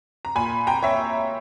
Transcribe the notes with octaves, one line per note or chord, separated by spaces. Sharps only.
A#5
A#2 G#5 B5
G5 A#5
C#5 E5